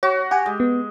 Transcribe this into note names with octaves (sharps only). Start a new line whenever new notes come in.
F#4 C#5
G4 F#5 G#5
G#3
B3